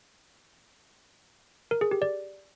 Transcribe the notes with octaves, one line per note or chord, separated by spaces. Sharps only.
A#4
G#4
G4
D5